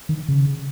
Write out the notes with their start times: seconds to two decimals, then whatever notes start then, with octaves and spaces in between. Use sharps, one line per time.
0.09 D#3
0.28 C#3